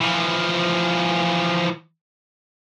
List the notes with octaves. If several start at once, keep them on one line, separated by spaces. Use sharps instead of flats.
E3 F3